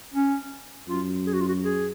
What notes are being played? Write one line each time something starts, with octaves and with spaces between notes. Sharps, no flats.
C#4
F#2 F4
G#4
F#4
F4
F#4
G#4